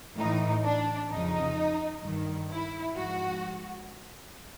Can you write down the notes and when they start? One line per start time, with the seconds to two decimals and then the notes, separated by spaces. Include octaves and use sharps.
0.17 A2 E3 D#4
0.64 D4
1.10 F2 C#3 F3 D#4
2.04 G2 D#3
2.51 E4
2.96 G#2 F3 F#4